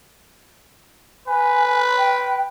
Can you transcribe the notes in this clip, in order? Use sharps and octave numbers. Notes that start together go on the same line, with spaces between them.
B4 G#5
G5